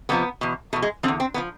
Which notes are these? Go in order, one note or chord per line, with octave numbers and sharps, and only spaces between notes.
F2 C3 F3 B3
E2 B2
E2 B2 A3
G#3
E2 D3 F3 C4
C4
D3 F3 B3